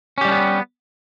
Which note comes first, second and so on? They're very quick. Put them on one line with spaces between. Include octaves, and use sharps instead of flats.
C#4 G4 G3 D4 B3